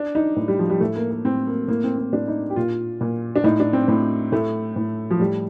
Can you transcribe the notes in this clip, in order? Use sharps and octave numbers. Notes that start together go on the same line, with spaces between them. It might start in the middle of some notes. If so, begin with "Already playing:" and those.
Already playing: D4
D#4
A2
G3
F3
G3
A2 A3
A#3
A#3
A2 C4
A#3
A2 A#3
C4
C4
A2 D4
D#4
G4
A#2 F4
A#2
D4
A2 D#4
D4
C4
A2
A2 A3
A2
F3
A2 G3